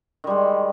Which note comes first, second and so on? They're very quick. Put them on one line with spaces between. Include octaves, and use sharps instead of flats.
D#3 G3 G#3